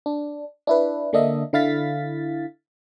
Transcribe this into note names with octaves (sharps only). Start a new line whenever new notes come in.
D4
D4 E4 B4
D3 A#3 D4 D#5 E5
D3 E4 F5 A6 B6